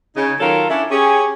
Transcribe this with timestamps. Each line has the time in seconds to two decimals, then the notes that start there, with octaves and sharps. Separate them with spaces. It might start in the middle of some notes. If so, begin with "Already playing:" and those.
0.16 C#3 D#4
0.40 D#3 F#3 F4 A4 A#4 C#5
0.70 C#4 D4 E4 A4
0.90 C#4 G4 G#4